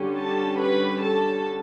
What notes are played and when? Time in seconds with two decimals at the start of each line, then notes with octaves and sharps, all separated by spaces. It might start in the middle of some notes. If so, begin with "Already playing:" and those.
Already playing: D3 G3 C#4
0.17 A4 A5
0.59 B4 B5
1.01 A4 A5